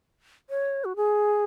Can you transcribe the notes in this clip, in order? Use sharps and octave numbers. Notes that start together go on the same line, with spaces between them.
C#5
F#4
G#4